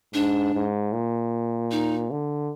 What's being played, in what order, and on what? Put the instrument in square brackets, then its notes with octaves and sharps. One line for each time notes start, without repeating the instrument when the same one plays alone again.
[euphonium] G#2 [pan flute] D4
[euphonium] G#2
A#2
[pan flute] D#4
[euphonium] D3